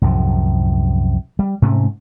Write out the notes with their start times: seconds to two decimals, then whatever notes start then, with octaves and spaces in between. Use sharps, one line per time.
0.02 C2 F#2 A2 F3
1.39 G3
1.62 G#2 C3 A3 C#4